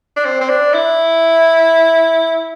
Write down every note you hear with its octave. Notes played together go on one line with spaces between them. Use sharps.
D4
C4
C4
D4
E4